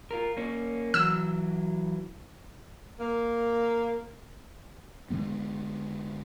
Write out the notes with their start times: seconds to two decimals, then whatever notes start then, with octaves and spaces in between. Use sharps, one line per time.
0.11 F4 A#4
0.37 A#3 C#4
0.94 E3 F#3 E6
2.99 A#3
5.10 D3 F#3 G#3 B3